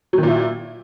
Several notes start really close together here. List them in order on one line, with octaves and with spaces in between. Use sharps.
F#3 D#3 A#2 E4